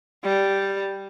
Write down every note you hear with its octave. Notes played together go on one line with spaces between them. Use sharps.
G3